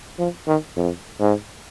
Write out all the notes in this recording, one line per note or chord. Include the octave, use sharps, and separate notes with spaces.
F3
D#3
F2
G#2